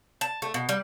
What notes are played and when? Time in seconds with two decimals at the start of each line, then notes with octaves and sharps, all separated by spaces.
0.21 A5
0.42 A3
0.54 B2
0.69 G3